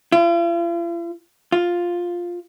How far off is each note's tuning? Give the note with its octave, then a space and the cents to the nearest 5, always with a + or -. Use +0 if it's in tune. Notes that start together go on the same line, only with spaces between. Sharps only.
F4 -45
F4 +5